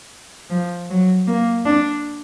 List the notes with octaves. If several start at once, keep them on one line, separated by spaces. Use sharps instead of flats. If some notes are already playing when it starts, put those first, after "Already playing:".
F3
F#3
A#3
D4